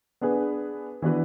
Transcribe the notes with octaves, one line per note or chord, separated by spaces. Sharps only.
B3 D4 G#4 B4
E3 B3 D4 F#4 B4